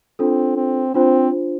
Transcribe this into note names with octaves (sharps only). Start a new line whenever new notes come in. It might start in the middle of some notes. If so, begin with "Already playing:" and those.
C4 D4 F4 A4
C4
C4 D4 F4 C5